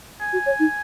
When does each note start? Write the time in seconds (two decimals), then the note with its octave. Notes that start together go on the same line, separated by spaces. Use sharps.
0.20 G#5
0.33 F#4
0.46 C#5
0.59 D#4